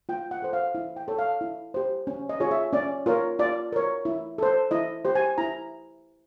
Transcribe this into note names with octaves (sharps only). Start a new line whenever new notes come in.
F4 G5
F#5
A4 C5
F5
E4
G5
A4 C#5
F5
E4
G4 C5
C#4
D#5
F4 G#4 C#5
E5
C#4 D5
F4 A#4 C#5
F4 D5
A#4 C#5
E4
A4 C5
E4 D#5
G4 C5
G#5
E4 A#5